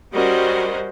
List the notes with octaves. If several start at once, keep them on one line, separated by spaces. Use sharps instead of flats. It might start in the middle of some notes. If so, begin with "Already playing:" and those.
G3 C#4 F#4 A#4 C5 D#5